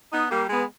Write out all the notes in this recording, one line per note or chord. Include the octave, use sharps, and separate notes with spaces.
B3 D#4
G3 A#3
G#3 B3